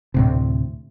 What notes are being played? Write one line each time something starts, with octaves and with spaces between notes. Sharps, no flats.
D2 A2 C3